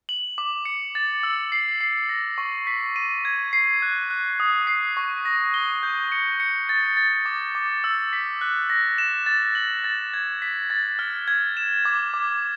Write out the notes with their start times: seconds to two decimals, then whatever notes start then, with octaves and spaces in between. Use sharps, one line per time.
0.09 F#7
0.38 D6
0.65 C#7
0.95 A6
1.23 E6
1.52 C7
1.81 C7
2.09 A#6
2.38 C#6
2.67 B6
2.96 D#7
3.25 G#6
3.53 C7
3.82 F#6
4.10 F#6
4.40 D#6
4.67 C7
4.97 C#6
5.25 A#6
5.54 G7
5.83 G6
6.12 C#7
6.40 C#7
6.69 A6
6.97 A6
7.25 D6
7.55 D6
7.84 E6
8.13 B6
8.41 F#6
8.70 A#6
8.98 E7
9.26 A6
9.55 F#7
9.84 A6
10.14 G#6
10.42 B6
10.70 A6
10.99 F6
11.28 G#6
11.57 E7
11.85 D6
12.14 D6